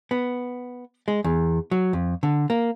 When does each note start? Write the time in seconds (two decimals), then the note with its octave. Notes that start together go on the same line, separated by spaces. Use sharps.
0.11 B3
1.08 G#3
1.24 E2
1.71 F#3
1.93 F2
2.23 D3
2.50 A#3